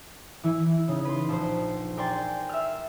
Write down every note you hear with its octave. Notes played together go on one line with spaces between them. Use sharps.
E3 E4
C#3 D#4
B4 C6
A#1 C5
A#4 D5 G5 G#5 C6 A6
E5 F6